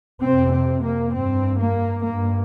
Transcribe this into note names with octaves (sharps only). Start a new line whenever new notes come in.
F2 C3 C4
C4
A#3
G2 C4
A#3
G2 A#3